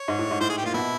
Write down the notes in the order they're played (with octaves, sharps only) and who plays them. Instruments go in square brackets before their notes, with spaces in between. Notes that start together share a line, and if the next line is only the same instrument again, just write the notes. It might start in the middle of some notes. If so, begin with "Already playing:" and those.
Already playing: [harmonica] C#5
[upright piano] G#2
A2
G#2
[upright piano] A2 [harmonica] C5
[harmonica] G#4
G4
[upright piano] A#2 [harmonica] F4
[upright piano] B2 [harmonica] E4